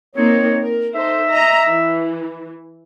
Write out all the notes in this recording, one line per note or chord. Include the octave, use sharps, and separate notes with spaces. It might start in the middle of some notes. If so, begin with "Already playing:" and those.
A#3 C4 D#4 C#5
A#4
D#4 A4 C5 E5
D#5 A#5
E3